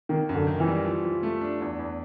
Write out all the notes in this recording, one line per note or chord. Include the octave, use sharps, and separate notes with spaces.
D#3 A#3
F#2
D3
D#3
E3
G3
F3
F3
A3
D4
E2
E2